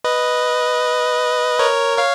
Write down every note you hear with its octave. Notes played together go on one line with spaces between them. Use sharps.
B4 D#5
A#4 C#5
C#5 F5